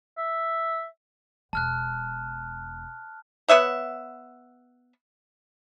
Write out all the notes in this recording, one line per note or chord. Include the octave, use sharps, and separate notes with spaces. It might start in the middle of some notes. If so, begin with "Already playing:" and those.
E5
E1 A5 F6 F#6
B3 C#5 E5 F#5